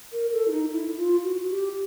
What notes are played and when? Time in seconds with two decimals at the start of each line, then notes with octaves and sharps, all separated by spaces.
0.13 A#4
0.33 A4
0.48 E4
0.52 D#4
0.72 E4
0.98 F4
1.24 F#4
1.51 G4